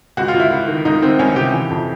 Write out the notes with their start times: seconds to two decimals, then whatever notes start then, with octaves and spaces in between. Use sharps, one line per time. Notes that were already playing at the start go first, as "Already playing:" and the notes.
0.17 C#2 F#4
0.28 F4
0.34 C#2
0.40 E4
0.51 C#2
0.68 D#3
0.85 C#2 D#4
1.02 D#3 C4
1.19 C#2 C#4
1.36 C3 G4
1.53 E3
1.70 F2